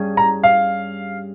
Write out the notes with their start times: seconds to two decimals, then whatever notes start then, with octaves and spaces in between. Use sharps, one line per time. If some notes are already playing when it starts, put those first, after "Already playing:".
Already playing: G2 G3 C#4 G#4
0.17 A#5
0.43 F5